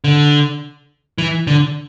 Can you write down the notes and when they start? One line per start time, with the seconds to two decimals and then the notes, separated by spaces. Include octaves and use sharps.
0.04 D3
1.18 E3
1.47 D3